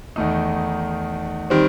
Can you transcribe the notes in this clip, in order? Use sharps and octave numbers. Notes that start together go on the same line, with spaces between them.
E2 D#3 A3 D#4
D#3 G3 C4